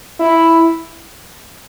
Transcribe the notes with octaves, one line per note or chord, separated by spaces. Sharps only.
E4